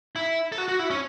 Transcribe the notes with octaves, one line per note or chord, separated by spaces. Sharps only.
E4
A4
F#4
F#4
E4
C#4